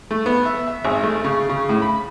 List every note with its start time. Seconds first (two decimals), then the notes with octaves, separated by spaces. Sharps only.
0.11 A3
0.26 B3
0.45 E5
0.67 E5
0.85 G#1
1.03 A3
1.24 C#3
1.49 C#3
1.69 A2
1.82 B5